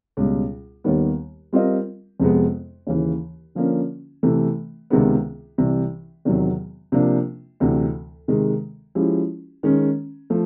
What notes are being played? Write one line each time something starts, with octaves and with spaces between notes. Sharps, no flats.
C#2 B2 G3
D#2 D#3 G3 B3
G3 C4 F4 A#4 D#5
F2 C3 F3 G#3 B3
D#2 C#3 E3
D3 F3 A#3 C#4
C3 E3 A3
C#2 C3 D#3 G#3 B3
C2 C3 E3
E2 C3 D#3 F#3
C3 F3 A#3 D4
D2 C3 E3
C3 D#3 G#3
F3 G#3 C#4 E4 G4
D#3 G#3 C#4
F3 A3